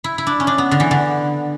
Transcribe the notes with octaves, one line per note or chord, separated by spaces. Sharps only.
E4
E4
D4
C#4
D4
B3
D3
E3
D3